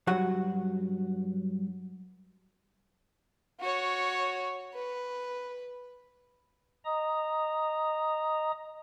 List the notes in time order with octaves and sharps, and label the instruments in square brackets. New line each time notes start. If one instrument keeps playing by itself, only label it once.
[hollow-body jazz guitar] G2 F#3 F#4 F#5
[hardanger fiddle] F#4 C#5
B4
[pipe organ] D#5 A#5 D#6